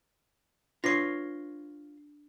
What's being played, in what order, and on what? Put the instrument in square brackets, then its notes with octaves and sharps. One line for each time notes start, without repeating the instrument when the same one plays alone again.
[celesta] D4 [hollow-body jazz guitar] F4 B4 C#5 [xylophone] A#6 C7